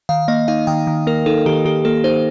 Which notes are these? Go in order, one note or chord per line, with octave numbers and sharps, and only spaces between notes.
D#3 F5
A#3 D#5
D#4 F5
D#3 G5
D#3
A#3 A#4
D#4 A4
D#3 G4
D#3 G4
A#3 A4
D#4 C5